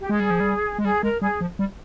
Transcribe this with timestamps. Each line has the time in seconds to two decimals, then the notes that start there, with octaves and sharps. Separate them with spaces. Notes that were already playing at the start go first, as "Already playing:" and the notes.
0.01 G4
0.09 G#3 G#4
0.20 G3
0.30 F3
0.40 G3
0.78 G#3
0.84 G3 G#4
1.03 G#3 A#4
1.22 G3 G#4
1.41 F3
1.59 G3